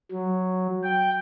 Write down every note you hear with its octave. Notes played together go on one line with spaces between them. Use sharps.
F#3
G5